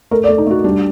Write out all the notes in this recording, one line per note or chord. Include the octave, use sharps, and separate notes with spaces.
A3 A#4
D5
A3
D#4
A3 F#4
G3 D4